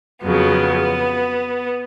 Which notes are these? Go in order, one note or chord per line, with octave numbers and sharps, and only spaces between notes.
F2 C#3 F#3 B3